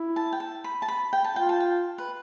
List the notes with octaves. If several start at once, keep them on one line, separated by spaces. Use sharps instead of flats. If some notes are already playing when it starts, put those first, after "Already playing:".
Already playing: E4
A5
G5
A5
B5
A5
B5
G5
A5
F4 G5
A5
G5
B4